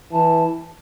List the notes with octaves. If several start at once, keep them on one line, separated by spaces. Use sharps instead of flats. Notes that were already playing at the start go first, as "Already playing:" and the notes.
E3 A5